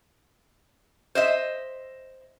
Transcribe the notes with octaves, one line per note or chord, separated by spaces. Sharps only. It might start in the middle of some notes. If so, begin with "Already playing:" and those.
C5 D#5 E5